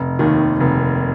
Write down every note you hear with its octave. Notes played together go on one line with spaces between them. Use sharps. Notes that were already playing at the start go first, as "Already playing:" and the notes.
Already playing: F1
D#2 D#3
F1